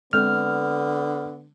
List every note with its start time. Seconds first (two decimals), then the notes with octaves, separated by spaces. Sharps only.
0.13 D3 G#3 B3 C4 A4 F6